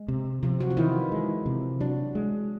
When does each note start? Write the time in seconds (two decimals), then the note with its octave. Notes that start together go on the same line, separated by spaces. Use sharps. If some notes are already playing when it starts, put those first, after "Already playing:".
Already playing: G#3
0.08 C3
0.43 C3 F3 F4
0.60 F#3 F#4
0.70 F4
0.77 D#3 E3 E4
1.12 G#3
1.46 C3
1.81 F#3 D4 F#4
2.15 G#3